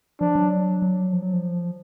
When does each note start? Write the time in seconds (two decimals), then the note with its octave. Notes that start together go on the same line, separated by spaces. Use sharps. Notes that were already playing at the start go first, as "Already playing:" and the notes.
0.21 F3 D4
0.35 F#3
0.82 F#3
1.13 F3
1.23 F#3
1.33 F3